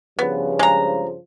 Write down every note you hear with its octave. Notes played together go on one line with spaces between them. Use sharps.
G2 C#3 F3 B3
G#3 A#5